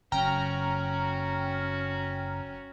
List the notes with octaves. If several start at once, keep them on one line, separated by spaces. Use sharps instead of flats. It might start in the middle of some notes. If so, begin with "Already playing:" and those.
F#1 C#4 F#4 G5 A#5 F6